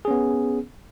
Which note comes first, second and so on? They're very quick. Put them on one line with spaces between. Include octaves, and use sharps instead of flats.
G#4 C#4 B3